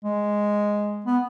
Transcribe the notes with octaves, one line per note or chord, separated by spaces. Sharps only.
G#3
B3